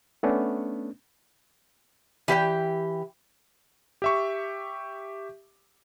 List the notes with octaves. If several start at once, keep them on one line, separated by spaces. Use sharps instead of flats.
A3 B3 C#4 D4
E3 G4 C5 G5
G4 E5 C#6